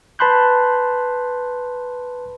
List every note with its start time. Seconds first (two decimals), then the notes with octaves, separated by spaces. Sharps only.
0.19 B4 A5 B5 C6 F#6 G6